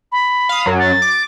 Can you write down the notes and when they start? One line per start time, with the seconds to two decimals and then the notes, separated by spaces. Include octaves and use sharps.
0.12 B5
0.49 F5 D#6
0.66 F#2 F#3
0.80 A6
1.02 D6